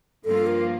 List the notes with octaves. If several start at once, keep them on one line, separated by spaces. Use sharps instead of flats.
G2 F3 A#3 F4 A4
A#4